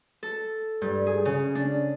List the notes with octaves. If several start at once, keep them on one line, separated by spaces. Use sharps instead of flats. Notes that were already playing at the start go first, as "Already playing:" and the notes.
A4
G2
G#4
C#3
D4